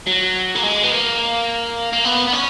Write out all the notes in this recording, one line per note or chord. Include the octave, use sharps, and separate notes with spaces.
F#3
A#3
G#3
B3
A#3
A#3
B3
B3
C#4